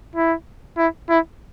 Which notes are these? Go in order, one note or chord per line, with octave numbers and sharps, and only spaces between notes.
E4
E4
E4